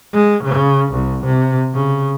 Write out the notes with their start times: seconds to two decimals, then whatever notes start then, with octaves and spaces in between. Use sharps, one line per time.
0.14 G#3
0.44 C#3
0.92 C2
1.25 C3
1.74 C#3